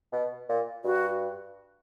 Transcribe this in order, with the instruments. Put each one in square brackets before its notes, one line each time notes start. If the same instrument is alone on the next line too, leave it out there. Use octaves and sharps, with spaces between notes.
[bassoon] B2
A#2
[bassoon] G2 [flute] F#4